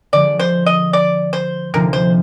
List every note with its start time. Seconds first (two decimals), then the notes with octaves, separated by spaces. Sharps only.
0.13 D3 F3 G#3 D5
0.39 C5
0.66 D#5
0.93 D5
1.33 C5
1.74 D2 C3 F3 A#3 D#4 A#4
1.93 C5